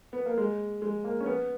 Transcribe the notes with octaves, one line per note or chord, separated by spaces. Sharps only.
B3
A#3
G#3
G#3
A#3
C#4
B3